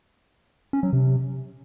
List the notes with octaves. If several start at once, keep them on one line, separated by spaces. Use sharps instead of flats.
C#4
F#3
C3